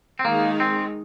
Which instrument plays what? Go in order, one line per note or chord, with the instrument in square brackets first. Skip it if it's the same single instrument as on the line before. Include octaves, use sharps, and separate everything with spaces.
[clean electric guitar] C4
[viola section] D#3 G#3 D#4 G#4 [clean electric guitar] A#3
[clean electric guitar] C4